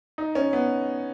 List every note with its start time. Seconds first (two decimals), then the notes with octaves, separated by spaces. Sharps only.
0.18 D#4
0.35 C#4
0.53 B3